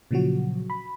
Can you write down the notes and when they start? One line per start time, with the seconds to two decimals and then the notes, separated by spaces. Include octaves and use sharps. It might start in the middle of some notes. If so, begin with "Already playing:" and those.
0.11 A#2 C#3 F3 F#3 F#4
0.70 B5